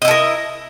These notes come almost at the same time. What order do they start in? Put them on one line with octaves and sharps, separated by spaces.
D#5 E4 A4 A#4